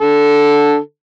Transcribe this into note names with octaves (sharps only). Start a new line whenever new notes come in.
D3 A4